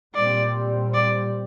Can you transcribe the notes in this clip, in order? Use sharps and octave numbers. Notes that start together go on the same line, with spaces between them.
A#2 G3 C4 D5
D5